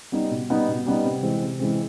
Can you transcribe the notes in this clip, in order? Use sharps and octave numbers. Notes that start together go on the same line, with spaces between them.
G3 B3 D#4
B2
G3 B3 D#4
B2
G3 B3 D#4
C3
E3 G#3 C4
C3
E3 G#3 C4